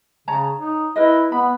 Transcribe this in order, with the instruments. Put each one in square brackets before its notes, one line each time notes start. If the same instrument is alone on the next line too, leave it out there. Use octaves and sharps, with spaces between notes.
[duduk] C#3 [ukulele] C#5 A5 A#5
[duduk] D#4
[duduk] E4 [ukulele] A#4 B4 D#5
[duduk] B3 [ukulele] B5